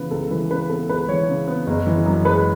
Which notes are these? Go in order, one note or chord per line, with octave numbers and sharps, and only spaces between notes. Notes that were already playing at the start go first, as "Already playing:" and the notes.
Already playing: C#3 E3 B3 B4
C#2 A4
E3 B4
C#3 B4
B3 A4
C#2 B4
E3 C#5
C#3
B3
F#1
E3
F#2
G#3 B4